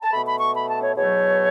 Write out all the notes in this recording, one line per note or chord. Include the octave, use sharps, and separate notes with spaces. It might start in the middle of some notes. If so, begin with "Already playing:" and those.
A5
B2 A3 B5
B5
C#6
B5
A5
C#5
E2 B2 F#3 A3 C#5